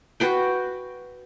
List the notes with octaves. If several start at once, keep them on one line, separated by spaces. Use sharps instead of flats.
F#4 B4 G5